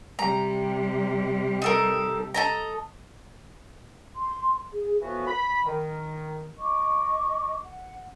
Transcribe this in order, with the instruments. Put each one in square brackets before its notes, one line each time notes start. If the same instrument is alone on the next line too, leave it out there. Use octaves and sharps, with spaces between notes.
[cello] C3 G3 [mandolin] A#5
[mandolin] D#4 A4 A#4
A4 D#5 A#5
[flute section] C6
G#4
[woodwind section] A2 E3 F3 B3 F#4
B5
D#3
[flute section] D#5 C#6 D6
F#5